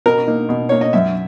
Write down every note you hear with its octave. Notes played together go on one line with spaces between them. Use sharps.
B2 A#4
A#3 D#4
B2
A#3 D#4 C#5
D#5
F#2 E5